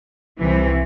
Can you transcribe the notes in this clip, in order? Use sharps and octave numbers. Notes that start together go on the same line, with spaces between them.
C2 C3 E3